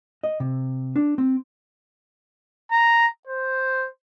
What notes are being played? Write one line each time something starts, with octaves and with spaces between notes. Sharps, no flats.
D#5
C3
D4
C4
A#5
C5